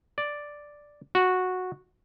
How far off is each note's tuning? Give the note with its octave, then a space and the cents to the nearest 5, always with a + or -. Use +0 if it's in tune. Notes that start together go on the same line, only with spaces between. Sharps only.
D5 +0
F#4 -10